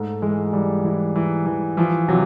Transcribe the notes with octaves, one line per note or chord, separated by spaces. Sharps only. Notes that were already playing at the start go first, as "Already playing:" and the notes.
Already playing: G#2 A3
E3 G#3
E3 G3
E3
E3
E3
E3 F3
C3 F#3